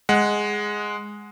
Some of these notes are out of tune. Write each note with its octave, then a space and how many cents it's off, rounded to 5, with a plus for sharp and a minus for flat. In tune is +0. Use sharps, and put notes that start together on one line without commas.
G#3 +0 F#5 +0